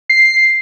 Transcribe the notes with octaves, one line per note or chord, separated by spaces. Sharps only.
C7